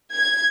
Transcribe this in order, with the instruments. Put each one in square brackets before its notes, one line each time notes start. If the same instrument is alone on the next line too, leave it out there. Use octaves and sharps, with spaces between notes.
[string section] G#6